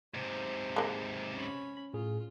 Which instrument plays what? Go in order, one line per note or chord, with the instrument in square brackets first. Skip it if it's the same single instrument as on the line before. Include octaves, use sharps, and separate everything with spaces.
[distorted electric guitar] G#2 C3 [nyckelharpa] C5
[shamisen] G#3 A#3
[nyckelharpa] C#4 B5
[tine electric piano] A2 G#4 [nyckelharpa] F4